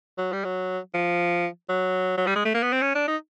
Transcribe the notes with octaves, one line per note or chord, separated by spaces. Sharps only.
F#3
G3
F#3
F3
F#3
F#3
G3
G#3
A3
A#3
B3
C4
C#4
D4
D#4